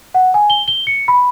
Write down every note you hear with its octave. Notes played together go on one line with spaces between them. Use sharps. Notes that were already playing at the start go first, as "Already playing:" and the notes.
F#5
G#5
G7
G7
C#7
B5